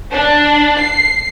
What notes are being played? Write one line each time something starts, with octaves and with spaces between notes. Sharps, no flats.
D4
C7